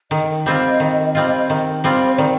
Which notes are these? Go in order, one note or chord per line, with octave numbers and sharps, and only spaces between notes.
D#3 D#5
G3 C4 F4
D#3
G3 C4 F4
D#3
G3 C4 F4
C5
D#3 D5